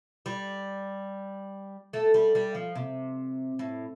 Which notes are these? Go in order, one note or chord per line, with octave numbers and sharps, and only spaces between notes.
G3
A3
G3
G3
F3
C3
A2